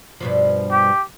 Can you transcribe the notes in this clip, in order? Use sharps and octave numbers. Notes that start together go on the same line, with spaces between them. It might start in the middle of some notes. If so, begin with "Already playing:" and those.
G2 B2 F3
G4